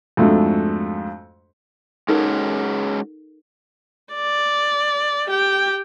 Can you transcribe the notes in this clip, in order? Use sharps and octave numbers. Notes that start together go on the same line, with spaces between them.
F2 G#2 A3 D4 F#4
G#3 C#4 D#4 F#4 A4 A#4
D5
G4 G5